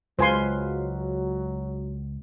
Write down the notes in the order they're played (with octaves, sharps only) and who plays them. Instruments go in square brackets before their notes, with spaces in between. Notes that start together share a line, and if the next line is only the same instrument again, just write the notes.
[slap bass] C#2 [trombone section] F#3 [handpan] G#3 F4 B4 [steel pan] C5 G#5 C6